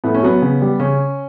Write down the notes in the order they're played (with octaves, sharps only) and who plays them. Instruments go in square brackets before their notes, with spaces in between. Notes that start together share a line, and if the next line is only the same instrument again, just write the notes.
[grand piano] A2 B3
C#4
F#3 B3
C#3
G3
C#3 C#4